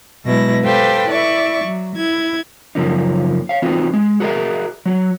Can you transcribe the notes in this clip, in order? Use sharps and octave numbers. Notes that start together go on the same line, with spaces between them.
B2 F#3 G#3 E4 B4 A#6
G4 A4 B4 C5 F5 G5
E4 D5 E5 C#6
F#3
E4 G#6
F#2 C#3 F3 A#3 C#4 D#4
C#5 F5
E3 C4 D#4 F4 F#4
G#3
F#4 G#4 A#4 C5 D#5 E5
F#3 F#4